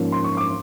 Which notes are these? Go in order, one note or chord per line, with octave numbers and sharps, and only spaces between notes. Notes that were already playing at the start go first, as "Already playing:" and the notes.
Already playing: G#2 F3 A#3 C#4
C6
C#6
D6